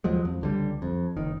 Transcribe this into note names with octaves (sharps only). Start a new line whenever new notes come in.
D#2 F3 F#3 G#3
F2
C#2 D3 G3
F2
F#1 D#3